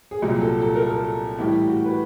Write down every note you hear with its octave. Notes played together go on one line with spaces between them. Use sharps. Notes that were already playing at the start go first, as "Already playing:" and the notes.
G#4
C2 A#2 F#3 G4
A4
A4
A#4
A4
A2 E3 G3 G4
F#4
B4